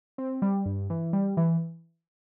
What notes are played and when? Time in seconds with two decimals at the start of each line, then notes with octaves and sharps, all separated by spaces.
0.18 C4
0.42 G3
0.66 G2
0.90 E3
1.13 G3
1.37 E3